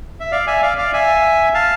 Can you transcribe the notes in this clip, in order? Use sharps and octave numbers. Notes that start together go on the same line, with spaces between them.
E5
D5 F5
E5 G#5
D5 F5
D5 F5
E5 G#5
F5 A5